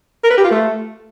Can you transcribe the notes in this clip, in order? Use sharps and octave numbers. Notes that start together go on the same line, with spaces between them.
A#4
B4
G4
F4
A3